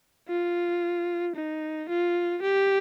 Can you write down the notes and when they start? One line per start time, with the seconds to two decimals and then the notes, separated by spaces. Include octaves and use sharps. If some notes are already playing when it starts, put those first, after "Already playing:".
0.28 F4
1.36 D#4
1.89 F4
2.42 G4